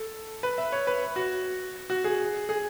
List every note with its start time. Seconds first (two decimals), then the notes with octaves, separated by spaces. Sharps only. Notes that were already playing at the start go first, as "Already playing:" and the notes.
Already playing: A4
0.43 B4
0.58 E5
0.72 C#5
0.87 B4
1.16 F#4
1.90 F#4
2.04 G#4
2.49 G#4